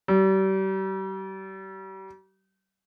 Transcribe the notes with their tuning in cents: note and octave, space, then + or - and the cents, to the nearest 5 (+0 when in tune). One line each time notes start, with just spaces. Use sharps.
G3 -35